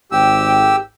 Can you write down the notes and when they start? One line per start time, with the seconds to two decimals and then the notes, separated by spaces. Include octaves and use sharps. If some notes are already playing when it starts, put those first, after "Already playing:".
0.12 G#1 G4 G5 E6